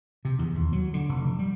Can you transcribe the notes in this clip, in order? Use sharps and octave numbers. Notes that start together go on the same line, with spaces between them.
C3
E2
D#2
F#3
D3
F1
G3